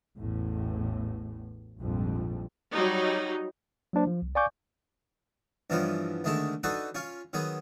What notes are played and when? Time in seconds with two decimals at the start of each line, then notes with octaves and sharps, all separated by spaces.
0.18 A1 E2 A2
1.79 A#1 F2 G#2 G3
2.72 F#3 G3 D#4
3.93 F#3 A#3 D4 C5
4.07 F3
4.22 C2
4.35 D5 F5 G#5 C#6 D6 G6
5.70 G2 E3 F3 B3 C#4
6.24 D2 D3 D#3 G#3 A3 A5
6.64 D4 D#4 F#4 A4 B4
6.95 C#4 F4 C#5
7.33 D#3 F#3 B3 G#4